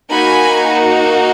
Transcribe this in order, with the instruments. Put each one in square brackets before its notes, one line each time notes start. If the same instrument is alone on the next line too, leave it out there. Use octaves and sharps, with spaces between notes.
[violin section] A#3 D#4 F#4 G#5 B5